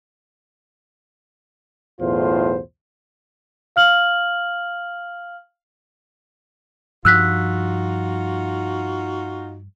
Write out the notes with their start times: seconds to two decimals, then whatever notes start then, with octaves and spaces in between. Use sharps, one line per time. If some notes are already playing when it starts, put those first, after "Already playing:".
2.00 B1 E2 A2 F4 C5
3.76 F5 F6 F#7
7.05 G2 F3 D#4 F4 F#4 E6 F#6 B6